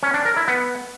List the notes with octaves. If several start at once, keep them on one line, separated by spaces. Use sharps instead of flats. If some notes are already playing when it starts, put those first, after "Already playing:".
C#4
D4
A#4
E4
B3